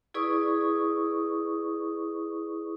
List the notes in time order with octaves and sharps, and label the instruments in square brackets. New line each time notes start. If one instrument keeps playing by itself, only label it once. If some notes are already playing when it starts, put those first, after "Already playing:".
[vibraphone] E4 G#4 B4 D5 C#6 D#6